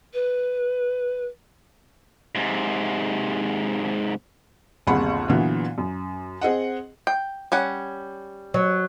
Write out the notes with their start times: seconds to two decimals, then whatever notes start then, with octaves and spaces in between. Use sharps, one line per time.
0.14 B4
2.35 G#2 C3
4.87 G1 D#2 C3 G#4 F#5 B5
5.29 A#2 D3 E3 F#3 B3
5.78 F#2
6.41 C4 G#4 D#5 F#5
7.07 G5
7.52 G3 C#4 F#5
8.54 F#3